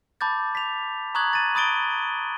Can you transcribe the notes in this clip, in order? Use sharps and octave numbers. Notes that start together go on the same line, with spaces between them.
A5 B5 D6 G6 A6
B6 F7
A#5 C#6 D#6 F#6 G#6 F#7
A6 D#7
B5 D#6 A6 D7 G7